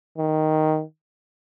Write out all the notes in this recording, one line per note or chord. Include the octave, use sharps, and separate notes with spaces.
D#3